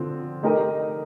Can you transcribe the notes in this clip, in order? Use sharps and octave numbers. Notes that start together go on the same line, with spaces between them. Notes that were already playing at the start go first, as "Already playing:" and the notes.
Already playing: D3 F3 C4 F4
A3 D#4 G4 A#4 D#5